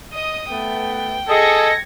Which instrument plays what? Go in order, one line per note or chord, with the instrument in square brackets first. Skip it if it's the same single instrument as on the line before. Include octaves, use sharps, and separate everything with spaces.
[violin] D#5 D#6
[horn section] A3 B3 [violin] G5
[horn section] G#4 D#5 [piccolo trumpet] A4 [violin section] G#6 A#6 C#7